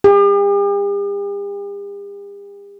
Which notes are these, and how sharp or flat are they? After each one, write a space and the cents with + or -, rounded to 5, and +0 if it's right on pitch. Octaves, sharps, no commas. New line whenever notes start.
G4 +45